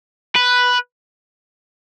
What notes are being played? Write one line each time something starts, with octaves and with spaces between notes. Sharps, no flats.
B4